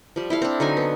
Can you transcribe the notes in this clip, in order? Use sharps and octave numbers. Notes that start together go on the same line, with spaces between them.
F3 G3
E4 A4 F5
C4 D4
D3 F#3 D#4 G#5
B3